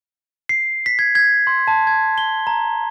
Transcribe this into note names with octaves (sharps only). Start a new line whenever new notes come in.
C7
B6
G#6
G#6
C6
A5
G#6
G7
A#5